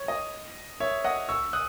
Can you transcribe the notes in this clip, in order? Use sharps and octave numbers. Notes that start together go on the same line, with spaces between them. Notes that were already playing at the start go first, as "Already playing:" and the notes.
Already playing: C#5
D#5
C#5 E5
D#5 F#5
C#6 E6
D#6 F#6